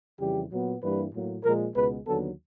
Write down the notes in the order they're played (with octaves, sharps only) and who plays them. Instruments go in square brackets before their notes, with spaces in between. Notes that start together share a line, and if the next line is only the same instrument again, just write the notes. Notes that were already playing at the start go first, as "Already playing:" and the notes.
[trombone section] F2 C#3 E3 G3 G4
A#2 F#3 B3
G2 E3 G3 A#3 B4
A2 F#3 A#3
A#2 F3 G#3 A#4
C#2 B2 G#3 B3 B4
D#2 D3 F#3 B3 A4